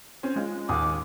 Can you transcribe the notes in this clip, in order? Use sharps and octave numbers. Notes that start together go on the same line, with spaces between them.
C4 C#4
G#3 F4
D#2 G#5 D6 D#6